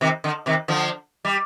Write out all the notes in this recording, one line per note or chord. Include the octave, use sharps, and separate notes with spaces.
C3 D#3
D3
C3 D#3
D3 F3
G3